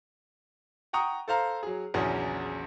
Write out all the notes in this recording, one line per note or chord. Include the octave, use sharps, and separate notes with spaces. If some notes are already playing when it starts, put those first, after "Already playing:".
F#5 G5 A#5 C#6 D#6
A4 C5 F5 A#5
F#3 G#4
A#1 E2 C#3 F#3 C#4 G#4